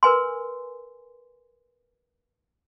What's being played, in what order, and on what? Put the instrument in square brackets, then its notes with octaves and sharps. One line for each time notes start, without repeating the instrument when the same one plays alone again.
[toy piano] A#4 B4 G#5 C6